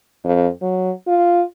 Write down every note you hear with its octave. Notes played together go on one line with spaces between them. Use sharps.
F2
F#3
F4